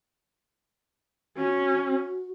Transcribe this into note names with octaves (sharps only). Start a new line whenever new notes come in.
C#4 F#4